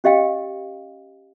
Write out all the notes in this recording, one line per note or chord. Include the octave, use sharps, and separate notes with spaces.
C#4 G4 D#5 F5 G5